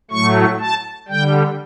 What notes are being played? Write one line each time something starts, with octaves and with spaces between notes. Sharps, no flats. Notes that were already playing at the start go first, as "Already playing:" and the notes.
A2 F#3 A3 C#6
A5
D3 G3 G5